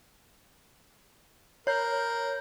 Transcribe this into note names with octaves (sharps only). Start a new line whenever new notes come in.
A#4 C#5 G6